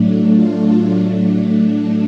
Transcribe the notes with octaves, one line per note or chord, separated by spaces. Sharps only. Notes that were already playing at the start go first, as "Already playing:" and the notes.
Already playing: A2 F#3 A3 D4
F4